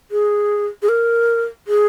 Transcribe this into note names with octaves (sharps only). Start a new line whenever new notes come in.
G#4
G#4
A#4
G#4